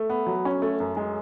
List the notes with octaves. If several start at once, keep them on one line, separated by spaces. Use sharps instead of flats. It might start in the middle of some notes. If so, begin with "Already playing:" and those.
Already playing: A3
B3
F#3
C#4
A3
F#2
G#3